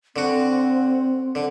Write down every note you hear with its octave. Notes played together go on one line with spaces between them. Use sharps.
D3 C4 F#4
D3